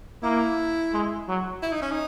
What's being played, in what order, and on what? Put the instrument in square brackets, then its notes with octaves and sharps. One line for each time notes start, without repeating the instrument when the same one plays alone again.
[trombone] A#3 [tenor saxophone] E4
[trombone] G#3
F#3
[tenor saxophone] E4
D#4
C#4
D#4